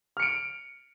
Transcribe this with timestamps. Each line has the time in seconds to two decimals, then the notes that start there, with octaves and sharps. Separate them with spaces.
0.17 F6
0.20 C#7
0.22 D7